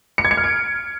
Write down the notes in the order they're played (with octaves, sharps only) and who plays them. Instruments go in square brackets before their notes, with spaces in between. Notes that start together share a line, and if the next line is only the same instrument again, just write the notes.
[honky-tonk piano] C#7
G#6
C#7
F6
D7